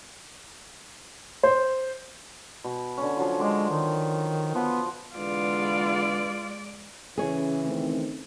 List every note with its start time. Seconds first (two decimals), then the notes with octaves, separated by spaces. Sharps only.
1.43 C5
2.64 B2
2.98 D3 C#4
3.17 F3 F#3 F4
3.40 G#3 C6 D6
3.70 D#3
4.55 F3 B3
5.16 E2 D3 G#3 F4 B4 D5
7.18 C#3 E3 G#4 C#5
7.65 D#3 A3 C4